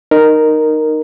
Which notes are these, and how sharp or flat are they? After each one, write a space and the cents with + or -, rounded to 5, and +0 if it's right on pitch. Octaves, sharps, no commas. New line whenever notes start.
D#4 -15 A#4 +0